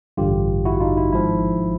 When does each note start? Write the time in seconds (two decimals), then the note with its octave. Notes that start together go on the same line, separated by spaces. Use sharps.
0.17 A1 G2 D3 F4 G4
0.65 E4 F#4
0.80 D#4 F4
0.97 E4
1.12 G#1 G#2 F3 E4